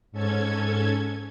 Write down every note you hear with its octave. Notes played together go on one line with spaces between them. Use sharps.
G#2 C#4 A4 G#6